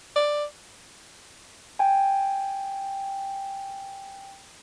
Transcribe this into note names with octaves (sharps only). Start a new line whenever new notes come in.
D5
G5 G#5